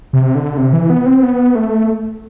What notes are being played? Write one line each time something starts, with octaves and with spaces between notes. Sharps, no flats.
C3
D3
C3
E3
B3
C4
B3
A3